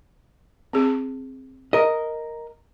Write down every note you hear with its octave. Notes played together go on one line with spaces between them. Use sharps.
C4 G#4
A#4 D#5